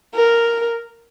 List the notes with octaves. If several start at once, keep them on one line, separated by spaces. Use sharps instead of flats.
A#4